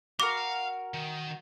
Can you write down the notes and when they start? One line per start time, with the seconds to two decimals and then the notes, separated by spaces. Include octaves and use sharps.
0.20 F#4 A#4 F5 D6
0.94 D#3